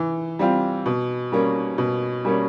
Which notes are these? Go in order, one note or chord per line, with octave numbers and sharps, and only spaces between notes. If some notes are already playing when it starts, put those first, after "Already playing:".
Already playing: E3
G3 C4 F4
B2
G3 A#3 C#4
B2
G3 A#3 C#4